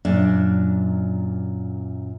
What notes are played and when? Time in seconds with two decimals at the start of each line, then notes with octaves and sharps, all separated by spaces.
0.05 F#2 A#2 D4